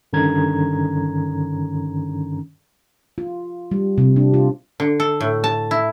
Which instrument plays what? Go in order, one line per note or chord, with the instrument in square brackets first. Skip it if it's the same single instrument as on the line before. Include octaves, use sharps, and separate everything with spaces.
[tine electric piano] G2 D3 D#3 C#4 A#5 G#6
[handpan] F4
G3
C3
D4
F4
[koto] D3
A4
A2
A5
E4